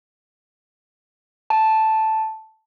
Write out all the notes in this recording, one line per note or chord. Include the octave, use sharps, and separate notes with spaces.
A5